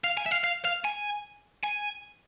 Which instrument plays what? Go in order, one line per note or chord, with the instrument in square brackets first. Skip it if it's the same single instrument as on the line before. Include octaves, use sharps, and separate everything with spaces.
[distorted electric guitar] F5
G#5
E5
F5
F5
F5
G#5
G#5